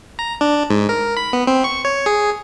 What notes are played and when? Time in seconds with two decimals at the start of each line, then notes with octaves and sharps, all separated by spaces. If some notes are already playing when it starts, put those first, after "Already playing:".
0.19 A#5
0.41 D4
0.70 G#2
0.89 A#4
1.17 B5
1.33 B3
1.47 C4
1.64 C#6
1.85 C#5
2.06 G#4